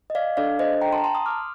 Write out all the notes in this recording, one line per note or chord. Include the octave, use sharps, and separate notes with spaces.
D#5
D5 F5
D4 A4 D5 F5
C5 D#5
G5 A#5
A5 C6
A#5
A5 C6
C6 D#6
D6 F6